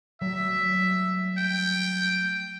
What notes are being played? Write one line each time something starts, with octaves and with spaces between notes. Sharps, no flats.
F#3 G3 A3 E5
G5